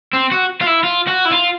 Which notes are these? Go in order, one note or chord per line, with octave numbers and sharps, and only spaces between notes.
C4
F#4
F4
E4
F4
F#4
E4
F4